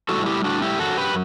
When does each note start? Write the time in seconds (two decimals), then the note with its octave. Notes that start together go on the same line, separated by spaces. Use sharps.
0.09 A2 G3 F#4 A4
0.26 E4 G4
0.44 D4 F#4
0.62 E4 G4
0.79 F#2 F#3 F#4 A4
0.97 G4 B4